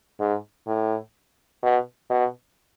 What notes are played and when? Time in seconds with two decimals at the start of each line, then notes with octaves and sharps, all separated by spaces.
0.20 G#2
0.67 A2
1.63 B2
2.10 B2